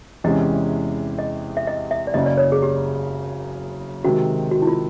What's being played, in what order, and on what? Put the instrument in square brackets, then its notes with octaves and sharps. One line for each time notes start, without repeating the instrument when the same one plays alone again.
[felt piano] E2 C3 E3 G#3 C#4 [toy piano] D#5
[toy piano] D#5
E5
D#5
E5
D5
[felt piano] F#1 F#2 C#3 [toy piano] D#5
[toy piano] D5
C#5
G#4
G4
[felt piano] C3 D#3 G#3 C4 [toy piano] F#4
[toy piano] F#4
E4
F4